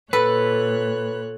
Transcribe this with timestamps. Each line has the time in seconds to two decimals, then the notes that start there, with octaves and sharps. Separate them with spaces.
0.13 A#2 A4 B4 C#5 F#6